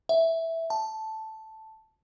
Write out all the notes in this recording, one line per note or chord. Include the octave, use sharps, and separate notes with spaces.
E5
A5